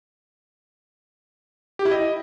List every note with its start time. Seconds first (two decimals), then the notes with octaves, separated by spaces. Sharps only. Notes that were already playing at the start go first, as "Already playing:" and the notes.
1.79 G4
1.85 E4
1.91 D#5